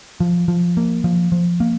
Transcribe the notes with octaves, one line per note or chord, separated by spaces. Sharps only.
F3
F3
A#3
F3
F3
A#3